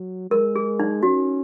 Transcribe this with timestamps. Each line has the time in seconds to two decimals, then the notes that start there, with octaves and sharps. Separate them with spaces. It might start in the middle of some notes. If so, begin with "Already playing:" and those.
Already playing: F#3
0.31 G#3 A#4
0.56 G#4
0.80 D#4
1.03 C#4 F#4